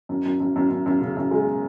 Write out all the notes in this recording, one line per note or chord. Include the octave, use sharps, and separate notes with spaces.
F#2
F#2
F#2
F#2
F#2
F#2
C#3
F#2
G#3